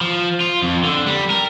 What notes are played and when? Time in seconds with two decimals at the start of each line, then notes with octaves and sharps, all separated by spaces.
0.01 F3
0.41 F4
0.62 F2
0.84 D3
1.06 G3
1.30 A#4